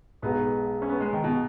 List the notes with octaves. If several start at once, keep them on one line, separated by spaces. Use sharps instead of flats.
B1 B2 G#3 B3 D#4 F#4
C#4
B3
G#3
D#3
B2